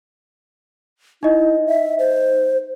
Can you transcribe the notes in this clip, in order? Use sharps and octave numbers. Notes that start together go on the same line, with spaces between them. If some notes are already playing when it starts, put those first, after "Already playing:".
D#4 E4 D#5
E5
C5